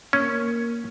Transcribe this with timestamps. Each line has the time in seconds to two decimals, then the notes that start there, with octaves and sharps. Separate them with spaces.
0.13 A#3 C#4